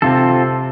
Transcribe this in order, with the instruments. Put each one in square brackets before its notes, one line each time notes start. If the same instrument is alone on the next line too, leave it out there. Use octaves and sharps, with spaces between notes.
[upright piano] C3 [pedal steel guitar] C4 F4 A4